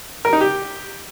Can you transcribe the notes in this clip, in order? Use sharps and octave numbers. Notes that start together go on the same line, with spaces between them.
A#4
D#4
G4